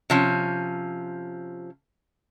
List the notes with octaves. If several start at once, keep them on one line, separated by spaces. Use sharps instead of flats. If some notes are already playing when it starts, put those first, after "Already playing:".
C3 F3 C#4